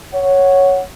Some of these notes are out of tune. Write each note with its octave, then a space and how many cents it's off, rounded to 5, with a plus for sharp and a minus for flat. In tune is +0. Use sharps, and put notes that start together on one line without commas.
C#5 +0 F#5 +0